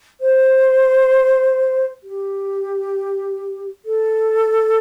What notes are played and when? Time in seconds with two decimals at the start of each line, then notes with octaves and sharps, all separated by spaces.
0.21 C5
2.03 G4
3.85 A4